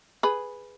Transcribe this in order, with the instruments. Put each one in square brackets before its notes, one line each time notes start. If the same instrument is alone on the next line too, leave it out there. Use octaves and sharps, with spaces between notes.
[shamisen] G#4 B4